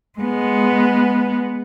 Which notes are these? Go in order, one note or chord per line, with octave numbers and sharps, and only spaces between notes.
G#3 B3